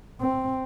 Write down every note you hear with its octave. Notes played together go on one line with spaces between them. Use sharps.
C4